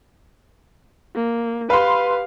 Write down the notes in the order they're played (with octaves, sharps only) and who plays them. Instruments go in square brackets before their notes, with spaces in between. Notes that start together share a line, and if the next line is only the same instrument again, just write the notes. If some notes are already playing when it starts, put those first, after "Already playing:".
[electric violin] A#3
[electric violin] G4 F5 [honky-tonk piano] B4 C6